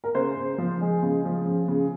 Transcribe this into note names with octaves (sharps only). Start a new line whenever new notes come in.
A#4
C#3 C5
C#3
F3
G#3
C#3
F3
C#3
C#3